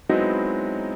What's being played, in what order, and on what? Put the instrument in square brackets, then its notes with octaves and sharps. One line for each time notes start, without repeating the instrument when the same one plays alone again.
[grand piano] F#3 G#3 B3 C4 D#4 E4